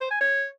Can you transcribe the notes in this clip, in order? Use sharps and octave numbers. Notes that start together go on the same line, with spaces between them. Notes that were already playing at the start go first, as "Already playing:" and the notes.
C5
G#5
C#5